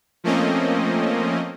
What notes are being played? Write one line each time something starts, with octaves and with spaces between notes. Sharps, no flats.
F3 A3 A#3 C4 C#4 D#5